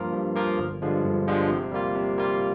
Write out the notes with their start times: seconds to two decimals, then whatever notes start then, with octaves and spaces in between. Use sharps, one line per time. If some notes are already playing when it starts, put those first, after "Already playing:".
Already playing: G2 F3 A#3 F4 A#4
0.13 G2
0.35 F3 A#3 F4 A#4
0.59 G1
0.82 G2 D3 F3 G#3
1.04 G1
1.27 G2 D3 F3 G#3
1.49 C3
1.71 G3 A#3 F4
1.95 C3
2.18 G3 A#3 F4